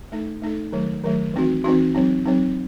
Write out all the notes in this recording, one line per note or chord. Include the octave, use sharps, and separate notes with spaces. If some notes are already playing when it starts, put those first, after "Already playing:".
A3 D#4 A4
A3 D#4 A4
D#3 F#3 A3
D#3 F#3 A3
E3 C4 D#4 F#4
E3 C4 D#4 F#4
F#3 C4 D#4
F#3 C4 D#4